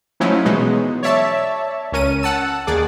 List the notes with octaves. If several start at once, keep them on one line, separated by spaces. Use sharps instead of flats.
F3 F#3 A3 C#4 D#4 E4
B2 E3 F#3 G#3 B3 D#4
C#5 D5 E5 A5
C#2 C#4 A#4 D#7
F#5 A5 E6
D#2 D#3 G#4 D5